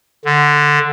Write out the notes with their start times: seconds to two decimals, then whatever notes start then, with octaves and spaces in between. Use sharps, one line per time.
0.25 D3